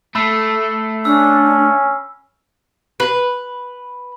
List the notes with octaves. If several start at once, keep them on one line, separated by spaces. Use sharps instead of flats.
A3 B5 E6 C7
C#4 D4 E6
B4